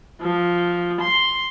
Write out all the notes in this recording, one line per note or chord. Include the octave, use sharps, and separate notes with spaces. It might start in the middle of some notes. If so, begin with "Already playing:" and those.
F3
C6